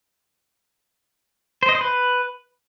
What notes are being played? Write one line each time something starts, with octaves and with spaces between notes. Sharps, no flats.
C5
D#5
C5
B4